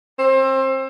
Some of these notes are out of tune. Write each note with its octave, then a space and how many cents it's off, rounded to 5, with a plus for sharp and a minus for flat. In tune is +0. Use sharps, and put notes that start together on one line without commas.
C4 +30